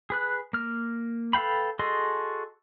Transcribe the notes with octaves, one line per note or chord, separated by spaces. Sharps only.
G#4 B4 F#6
A#3 F6
A4 B4 F5 G5 B5
F#4 G#4 A4 D#5 C6